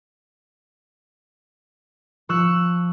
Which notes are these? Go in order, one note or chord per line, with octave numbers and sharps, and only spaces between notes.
F3 C#6 E6 F#6 C#7